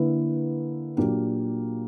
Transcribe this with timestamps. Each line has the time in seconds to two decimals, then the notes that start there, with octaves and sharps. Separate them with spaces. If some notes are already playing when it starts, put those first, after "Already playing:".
Already playing: D3 A#3 E4 B4
0.97 A#2 F#3 A#3 D4 G4